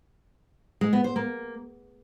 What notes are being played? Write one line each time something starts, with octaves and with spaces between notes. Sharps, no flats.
G#3
B3
C5
A#3